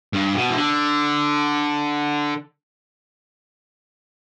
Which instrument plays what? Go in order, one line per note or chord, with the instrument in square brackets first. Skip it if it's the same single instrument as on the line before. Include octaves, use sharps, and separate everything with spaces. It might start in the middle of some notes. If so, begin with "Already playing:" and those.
[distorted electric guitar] G2
B2
E3
D3